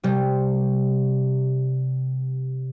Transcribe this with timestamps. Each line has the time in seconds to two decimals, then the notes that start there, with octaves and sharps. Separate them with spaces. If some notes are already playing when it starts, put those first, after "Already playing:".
0.04 C3 G3